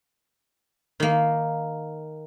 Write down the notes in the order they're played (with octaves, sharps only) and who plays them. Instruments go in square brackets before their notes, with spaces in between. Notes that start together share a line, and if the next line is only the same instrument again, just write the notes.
[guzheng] D#3 A#3